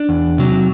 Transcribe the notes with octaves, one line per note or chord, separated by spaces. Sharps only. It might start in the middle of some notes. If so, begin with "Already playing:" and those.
Already playing: D4
E2
C3 F#3